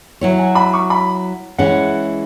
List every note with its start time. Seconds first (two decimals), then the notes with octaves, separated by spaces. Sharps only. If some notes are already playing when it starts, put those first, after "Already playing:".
0.21 F#3 E4 C#5
0.39 G#5
0.55 B5
0.73 C#6
0.90 B5
1.58 E3 G#3 C#4 F#5